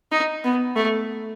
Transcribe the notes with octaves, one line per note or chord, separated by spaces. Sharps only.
D#4
B3
A3